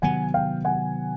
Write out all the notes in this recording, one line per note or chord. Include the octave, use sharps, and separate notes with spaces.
C3 D#3 F#3 B3 F#5 G#5
F5 G5
F#5 G#5